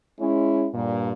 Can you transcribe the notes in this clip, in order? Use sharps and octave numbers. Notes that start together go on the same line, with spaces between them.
G#3 C#4 E4
G2 A#2